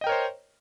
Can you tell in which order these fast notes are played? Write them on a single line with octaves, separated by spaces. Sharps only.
D#5 G5 A#4 C#5 C5